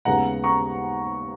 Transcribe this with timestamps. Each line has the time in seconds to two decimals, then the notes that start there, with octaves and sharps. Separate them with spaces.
0.05 D#2 C#3 G#3 B3 F#5 A#5
0.44 A#5 C#6